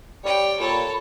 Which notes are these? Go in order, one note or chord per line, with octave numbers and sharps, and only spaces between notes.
G3 C#5 G5
A#2 A4 C#5 B5